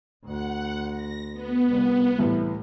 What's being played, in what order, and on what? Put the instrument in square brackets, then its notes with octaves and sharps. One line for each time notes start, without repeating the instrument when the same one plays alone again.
[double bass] D2 [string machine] F#5
[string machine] A#6
B3
[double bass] C2
[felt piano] C2 E3 [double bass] A2